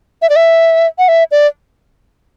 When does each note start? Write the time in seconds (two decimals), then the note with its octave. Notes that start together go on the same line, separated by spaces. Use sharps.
0.22 E5
0.30 D5
0.36 E5
0.99 F#5
1.08 E5
1.31 D5